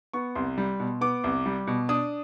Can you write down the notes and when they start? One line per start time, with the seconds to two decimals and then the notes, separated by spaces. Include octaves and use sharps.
0.13 B3 C#6
0.35 C2 C6
0.58 G3
0.80 B2
1.01 B3 D6
1.24 C2
1.46 G3
1.67 B2
1.89 D4 D#6